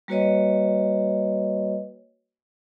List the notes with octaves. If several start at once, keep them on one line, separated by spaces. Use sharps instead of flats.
G3 A#3 F#4 B4 C#5 D#5